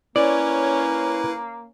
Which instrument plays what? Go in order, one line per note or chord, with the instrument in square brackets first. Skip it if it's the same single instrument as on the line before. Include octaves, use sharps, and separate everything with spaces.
[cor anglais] A#3 [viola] C#4 C#5 [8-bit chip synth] E4 B4 [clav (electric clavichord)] D5